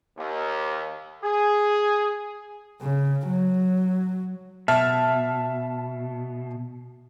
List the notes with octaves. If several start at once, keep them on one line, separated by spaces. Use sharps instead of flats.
D#2
G#4
C#3
F#3
B2 E5 A5 F6